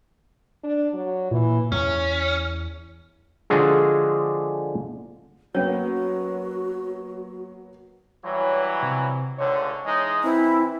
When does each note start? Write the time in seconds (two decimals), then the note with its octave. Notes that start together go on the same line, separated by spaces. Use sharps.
0.63 D4
0.94 F#3
1.31 A#2 E3
1.72 E2 C#4
3.50 D3 F3 G#3 D4 F#4 G#4
5.55 F#3 A#3 B3 C#4 F#4 C#5
8.23 E3 F#3 G3 C#5
8.82 C3
9.38 C#2 G#2 D3 C#5
9.85 E3 G#3 D#4
10.24 E3 C4 E4